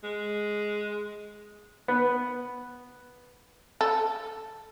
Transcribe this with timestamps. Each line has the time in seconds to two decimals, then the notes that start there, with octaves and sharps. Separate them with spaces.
0.03 G#3
1.88 B3
3.81 A4